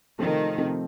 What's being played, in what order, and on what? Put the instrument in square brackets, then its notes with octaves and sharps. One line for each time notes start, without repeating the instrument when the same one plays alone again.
[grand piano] C3 F3 A3 C4 [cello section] D#3
[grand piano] C3 F3 A3 C4